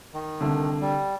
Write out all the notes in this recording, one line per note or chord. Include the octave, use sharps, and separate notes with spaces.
D#3
C2 D3
G3